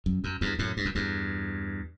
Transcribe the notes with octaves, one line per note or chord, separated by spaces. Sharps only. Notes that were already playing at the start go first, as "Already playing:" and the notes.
F#2
F#2
E2 G2
F#2 A2
G2
F#2
E2 G2